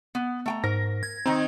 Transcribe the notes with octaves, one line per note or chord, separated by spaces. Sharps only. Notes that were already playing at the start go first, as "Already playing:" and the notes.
B3
A3 G5 A#5
G#2 A#4 A#6
G#6
D#3 C4 D#4 A#5